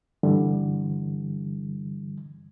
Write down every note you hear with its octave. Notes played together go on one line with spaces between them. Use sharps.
G2 D3 E3 G3